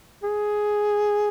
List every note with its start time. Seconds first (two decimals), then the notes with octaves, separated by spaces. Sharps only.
0.23 G#4